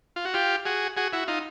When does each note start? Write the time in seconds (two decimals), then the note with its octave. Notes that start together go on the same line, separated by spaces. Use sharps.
0.16 F4
0.25 F#4
0.34 F4 G4
0.65 F#4 G#4
0.97 F#4 G#4
1.13 E4 F#4
1.28 D#4 F4